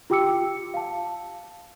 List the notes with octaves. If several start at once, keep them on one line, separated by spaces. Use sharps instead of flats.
F4 G4 G5 D6 E6 C#7
F5 A5